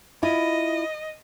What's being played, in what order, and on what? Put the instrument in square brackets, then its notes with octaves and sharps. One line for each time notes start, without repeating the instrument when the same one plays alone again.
[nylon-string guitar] E4 F4 [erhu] D#5